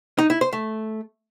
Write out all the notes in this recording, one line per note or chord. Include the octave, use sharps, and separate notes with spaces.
D#4
E4
C5
A3